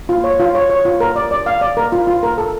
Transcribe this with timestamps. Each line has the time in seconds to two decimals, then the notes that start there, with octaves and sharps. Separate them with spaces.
0.09 F4
0.24 C#5
0.40 F4
0.55 C#5
0.70 C#5
0.85 F4
1.00 A#4
1.16 D5
1.31 D5
1.46 F5
1.61 D5
1.77 A#4
1.92 F4
2.07 F4
2.23 A#4
2.38 A4